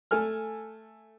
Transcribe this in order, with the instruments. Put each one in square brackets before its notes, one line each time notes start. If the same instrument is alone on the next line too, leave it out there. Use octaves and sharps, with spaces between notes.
[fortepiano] A3 A4 G#5 F6